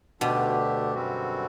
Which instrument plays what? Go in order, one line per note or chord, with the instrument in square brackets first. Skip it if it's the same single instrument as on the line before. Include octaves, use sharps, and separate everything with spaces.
[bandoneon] D2 D3 A3 D4 G4 [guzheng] B2
[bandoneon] F#2 D3 G3 C4 F#4